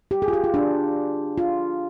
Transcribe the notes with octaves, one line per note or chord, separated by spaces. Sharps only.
G4
G#4
F4
G4
F4
D4
F4